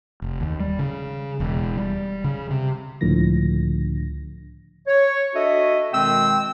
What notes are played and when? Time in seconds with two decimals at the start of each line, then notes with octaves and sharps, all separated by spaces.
0.22 F1
0.41 D#2
0.60 G3
0.79 C#3
1.40 E1
1.77 G3
2.24 C#3
2.50 C3
3.01 C#2 A2 D3 F3 A#6
4.87 C#5
5.35 D4 F#4 A4 D#5 E5
5.93 B2 D#3 G#3 C4 G5 E6